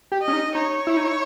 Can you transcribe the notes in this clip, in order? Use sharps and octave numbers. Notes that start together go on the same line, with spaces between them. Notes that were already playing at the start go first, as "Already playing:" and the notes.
G4
D#5
C#4
D#4
D#4 C#5
E4
D#4
E4